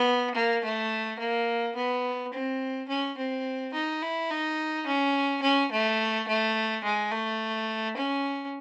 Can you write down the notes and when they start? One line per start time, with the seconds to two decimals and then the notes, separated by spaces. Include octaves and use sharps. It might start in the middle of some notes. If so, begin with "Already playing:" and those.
Already playing: B3
0.35 A#3
0.64 A3
1.19 A#3
1.76 B3
2.33 C4
2.88 C#4
3.17 C4
3.74 D#4
4.02 E4
4.31 D#4
4.87 C#4
5.42 C#4
5.72 A3
6.28 A3
6.84 G#3
7.12 A3
7.97 C#4